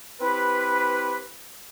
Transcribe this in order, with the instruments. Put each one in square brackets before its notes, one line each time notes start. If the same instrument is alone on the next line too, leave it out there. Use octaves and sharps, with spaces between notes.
[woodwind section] C4 E4 G4 B4